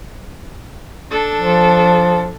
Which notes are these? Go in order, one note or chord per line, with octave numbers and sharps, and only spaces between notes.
D4 A4
F3